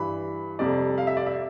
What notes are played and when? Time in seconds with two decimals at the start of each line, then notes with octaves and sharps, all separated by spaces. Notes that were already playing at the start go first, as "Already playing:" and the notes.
Already playing: G2 E3 G3 B5
0.59 F2 C3 G3 D5
0.98 F5
1.07 E5
1.17 D5
1.26 E5